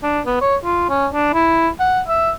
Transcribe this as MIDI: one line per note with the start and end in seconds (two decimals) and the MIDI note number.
0.03 0.20 62
0.26 0.38 59
0.41 0.56 73
0.64 0.86 65
0.89 1.07 61
1.13 1.31 62
1.34 1.68 64
1.80 2.01 78
2.08 2.31 76